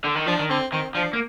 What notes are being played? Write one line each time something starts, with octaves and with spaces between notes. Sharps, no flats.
D3
D#3
F3 D4
D#3
D3 C4
D#3 C4
F3 D4
A#3